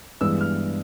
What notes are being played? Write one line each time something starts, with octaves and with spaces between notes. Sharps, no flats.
G2 E3 G#3 B3 E6
F6